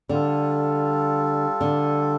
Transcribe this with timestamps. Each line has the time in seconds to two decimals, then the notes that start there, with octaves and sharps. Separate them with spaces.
0.09 D3 G3 F4 A4
1.61 D3